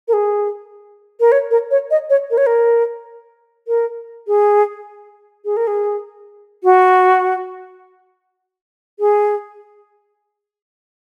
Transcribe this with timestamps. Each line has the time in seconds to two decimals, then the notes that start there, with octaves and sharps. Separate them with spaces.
0.08 A#4
0.13 G#4
1.20 A#4
1.32 C#5
1.51 A#4
1.71 C#5
1.91 D#5
2.10 C#5
2.31 A#4
2.38 C#5
2.46 A#4
3.68 A#4
4.27 G#4
5.45 G#4
5.57 A#4
5.67 G#4
6.64 F#4
9.00 G#4